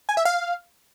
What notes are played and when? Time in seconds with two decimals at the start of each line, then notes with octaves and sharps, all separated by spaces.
0.09 G#5
0.17 E5
0.25 F5